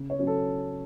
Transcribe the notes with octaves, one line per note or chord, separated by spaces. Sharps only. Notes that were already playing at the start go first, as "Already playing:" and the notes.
Already playing: C#3
C#5
F#3 C#4
A4